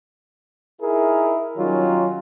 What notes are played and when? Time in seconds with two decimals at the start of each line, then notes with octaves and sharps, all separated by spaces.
0.81 D#4 E4 G#4 A#4
1.57 D#3 F#3 G3 C#4 D#4 F4